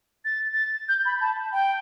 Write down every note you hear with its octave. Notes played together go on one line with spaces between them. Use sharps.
A6
A6
G6
B5
A5
G5